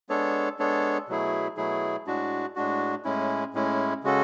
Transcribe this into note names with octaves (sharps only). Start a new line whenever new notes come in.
G#3 B3 D4 A4 C#5
G#3 B3 D4 A4 C#5
B2 F#3 A3 E4 G#4
B2 F#3 A3 E4 G#4
A2 G#3 D4 F#4
A2 G#3 D4 F#4
A2 G#3 C#4 E4
A2 G#3 C#4 E4
C#3 G#3 C#4 F#4 A4